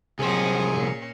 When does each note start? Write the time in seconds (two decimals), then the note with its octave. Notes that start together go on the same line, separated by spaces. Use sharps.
0.19 C2 F3 F#3 C4 D#4 G#4
0.74 A#2 C#4